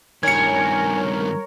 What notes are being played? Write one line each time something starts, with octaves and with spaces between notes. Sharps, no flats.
G2 D#3 A#4 C#5 G#5 G#6 C#7